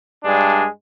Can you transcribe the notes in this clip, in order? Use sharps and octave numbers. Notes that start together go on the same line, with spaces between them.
G2 G#3 D4